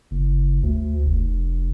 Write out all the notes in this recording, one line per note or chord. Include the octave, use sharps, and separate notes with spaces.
F#1
D2
F1